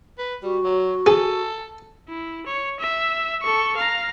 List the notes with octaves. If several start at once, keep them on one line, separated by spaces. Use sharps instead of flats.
B4
G3 F#4
F#3
G#4 A4
E4
C#5
E5
A4 C#6
F5 A#5